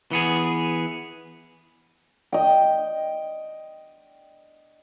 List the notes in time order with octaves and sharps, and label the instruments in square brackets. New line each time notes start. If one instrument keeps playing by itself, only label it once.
[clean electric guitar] E3 B3 G#4
[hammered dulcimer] D#5 G5